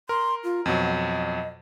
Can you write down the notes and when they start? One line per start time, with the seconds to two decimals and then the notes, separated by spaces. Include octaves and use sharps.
0.09 A#4 C6
0.44 F4
0.66 F2 B2 F#3 D#5